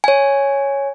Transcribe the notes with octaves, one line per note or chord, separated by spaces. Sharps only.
C#5 G#5